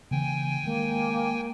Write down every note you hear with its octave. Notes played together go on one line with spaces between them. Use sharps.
C#3 E3 A#3 G5 G#5
D#3 G#3 A#3